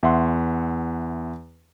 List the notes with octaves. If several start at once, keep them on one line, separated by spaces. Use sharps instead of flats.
E2 E5 F#5 C6